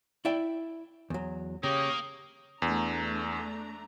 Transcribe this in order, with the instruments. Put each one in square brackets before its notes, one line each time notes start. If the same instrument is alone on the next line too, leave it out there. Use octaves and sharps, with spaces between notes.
[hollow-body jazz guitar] E4 D5 E5 G5
E2 F#3
[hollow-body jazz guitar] C#3 [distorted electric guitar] A#3 A#4 [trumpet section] G4 C#5 [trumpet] D#6
[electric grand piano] E2 [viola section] A3 D4 A#5